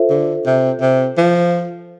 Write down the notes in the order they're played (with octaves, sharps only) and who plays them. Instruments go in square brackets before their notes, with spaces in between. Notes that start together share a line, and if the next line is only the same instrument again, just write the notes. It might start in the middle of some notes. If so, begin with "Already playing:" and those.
Already playing: [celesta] F4 A4 C5 E5
[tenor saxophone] D3
C3
C3
F3